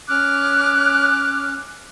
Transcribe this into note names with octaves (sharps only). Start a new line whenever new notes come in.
C#4 D6 F6 F#6